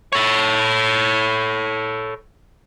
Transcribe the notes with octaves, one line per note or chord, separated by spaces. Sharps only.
A4 C#5